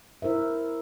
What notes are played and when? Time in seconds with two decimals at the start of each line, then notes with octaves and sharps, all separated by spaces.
0.22 E4 A#4 C5 E5